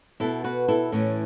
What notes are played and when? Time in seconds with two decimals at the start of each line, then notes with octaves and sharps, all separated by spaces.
0.20 B2 B3 E4 A4
0.44 F#4 B4
0.68 E4 A4
0.92 A2 E3 A3 C#4